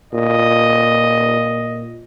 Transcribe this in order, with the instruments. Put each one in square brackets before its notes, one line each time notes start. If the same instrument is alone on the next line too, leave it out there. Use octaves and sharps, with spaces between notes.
[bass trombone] A#2 [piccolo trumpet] D#5